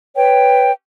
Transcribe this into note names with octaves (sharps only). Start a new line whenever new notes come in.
B4 C#5 G5